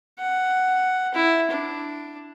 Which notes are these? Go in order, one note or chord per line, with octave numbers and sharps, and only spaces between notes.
F#5
E4
D4